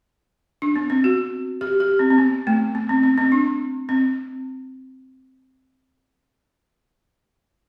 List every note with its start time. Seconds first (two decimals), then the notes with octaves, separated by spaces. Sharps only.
0.62 D4
0.76 B3
0.90 C4
1.04 F#4
1.61 G4
1.80 G4
1.99 C4
2.10 C4
2.18 B3
2.47 A3
2.75 B3
2.89 C4
3.03 C4
3.18 C4
3.32 D4
3.89 C4